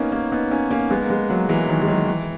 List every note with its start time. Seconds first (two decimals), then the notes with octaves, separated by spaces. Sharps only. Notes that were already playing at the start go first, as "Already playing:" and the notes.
Already playing: A#3 B3 C#4 D#4
0.12 A#3 C#4
0.32 B3 D#4
0.51 A#3 C#4
0.71 A#3 C#4
0.90 G#3 B3
1.02 A#3
1.10 G#3 B3
1.29 F#3 A#3
1.49 E3 G#3
1.69 D#3 F#3
1.82 G#3
1.88 D#3 F#3
2.08 E3